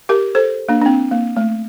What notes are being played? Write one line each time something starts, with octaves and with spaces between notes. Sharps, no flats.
G4 A#4
A4 C5
A#3 D4
D4
C4
A#3
A3